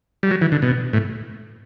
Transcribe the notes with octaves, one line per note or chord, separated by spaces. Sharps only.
G3
F#3
E3
D3
B2
A2